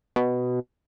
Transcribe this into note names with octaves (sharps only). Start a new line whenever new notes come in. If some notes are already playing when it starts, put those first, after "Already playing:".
B2